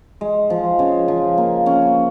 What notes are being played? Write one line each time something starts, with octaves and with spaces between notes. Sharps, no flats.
G#3
F3
C#3
F3
A#3
C#4